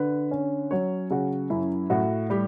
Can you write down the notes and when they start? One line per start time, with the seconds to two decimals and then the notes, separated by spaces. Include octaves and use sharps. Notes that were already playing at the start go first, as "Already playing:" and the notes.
Already playing: D3 B4
0.31 C#4
0.71 F#3 C#5
1.10 C#3 F#4
1.50 F#2 E4
1.90 A2 F#4
2.30 G3 G4